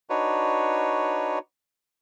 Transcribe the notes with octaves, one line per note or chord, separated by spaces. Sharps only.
D4 D#4 F#4 B4 C#5